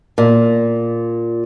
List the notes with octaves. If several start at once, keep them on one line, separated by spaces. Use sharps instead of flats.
A#2